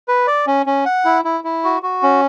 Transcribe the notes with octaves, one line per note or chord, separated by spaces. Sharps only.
B4
D5
C#4
C#4
F#5
E4
E4
E4
F#4
F#4
C#4